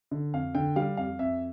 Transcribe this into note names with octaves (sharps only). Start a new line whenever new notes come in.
D3
F2 F5
D3 G5
G3 F5
F2 F5
F2 E5